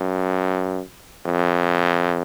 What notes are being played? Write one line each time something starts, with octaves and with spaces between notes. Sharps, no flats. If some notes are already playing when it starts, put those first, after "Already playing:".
Already playing: F#2
F2